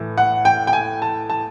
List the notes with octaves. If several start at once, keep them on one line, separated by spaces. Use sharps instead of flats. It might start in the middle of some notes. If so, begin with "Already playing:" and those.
Already playing: A2 E3
F#5
G5
G5
G#5
A5
A5